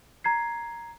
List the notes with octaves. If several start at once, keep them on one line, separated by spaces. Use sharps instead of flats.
A#5 G#6 C7